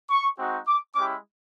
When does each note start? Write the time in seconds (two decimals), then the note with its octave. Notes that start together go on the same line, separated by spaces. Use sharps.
0.10 C#6
0.38 G#3 C4 D#4 F#4
0.67 D6
0.95 G#3 C#4 E4 G4 D6